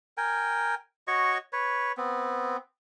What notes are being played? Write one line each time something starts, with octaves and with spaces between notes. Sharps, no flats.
A#4 G5 G#5
F#4 C#5 D#5 C#6
B4 C#5
B3 C4